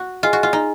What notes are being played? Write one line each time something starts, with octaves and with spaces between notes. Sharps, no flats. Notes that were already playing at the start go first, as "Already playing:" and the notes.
Already playing: F#4
F4 G#4 D#5 G#5
F#4
F4
D#4